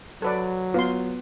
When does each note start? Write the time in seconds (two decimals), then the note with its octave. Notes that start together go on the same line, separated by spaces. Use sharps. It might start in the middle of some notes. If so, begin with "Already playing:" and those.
0.22 F#3 A4 B4 D5
0.74 B3 F4 C6